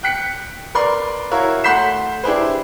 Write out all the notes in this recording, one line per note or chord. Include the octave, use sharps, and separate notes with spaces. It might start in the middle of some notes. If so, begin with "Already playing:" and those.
G5 F#6 B6 C#7
A#4 B4 D5 C6
E4 F#4 A#4 C#5 E5 F5
A3 F#5 C6 G6 B6 E7
D4 E4 G4 G#4 B4 C5